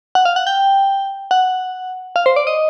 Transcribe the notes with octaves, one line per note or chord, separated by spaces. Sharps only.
F#5
F5
F#5
G5
F#5
F5
C5
D5
D#5